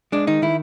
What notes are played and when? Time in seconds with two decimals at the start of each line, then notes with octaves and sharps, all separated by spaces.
0.12 G#3 D4
0.27 D#3 D#4
0.42 D#3 E4